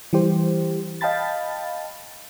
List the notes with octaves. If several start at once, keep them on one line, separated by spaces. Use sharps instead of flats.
E3 G3 G4 C5
D#5 F5 G5 A5 B5 A6